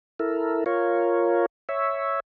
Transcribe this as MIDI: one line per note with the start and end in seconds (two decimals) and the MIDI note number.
0.19 0.64 64
0.19 0.64 69
0.19 0.64 70
0.66 1.46 65
0.66 1.46 70
0.66 1.46 73
1.69 2.20 73
1.69 2.20 76